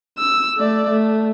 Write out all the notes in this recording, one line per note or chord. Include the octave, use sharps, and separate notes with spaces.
E6
A3 D5
A3